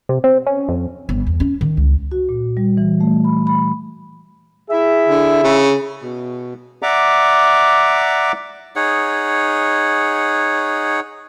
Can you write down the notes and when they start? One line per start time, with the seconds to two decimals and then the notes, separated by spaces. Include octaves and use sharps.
0.09 C3
0.24 C4
0.47 C#4
0.68 F2
1.09 G1
1.27 E2
1.40 C#4
1.61 D#3
1.77 C#2
2.12 F#4
2.29 A#2
2.57 G3
2.77 E3
3.00 A3
3.24 B5
3.47 B5
4.70 E4 G#4 E5
5.09 D3
5.44 C#3
6.02 B2
6.82 D5 E5 F#5 A#5 D6
8.76 D#4 G#4 C#5 F#5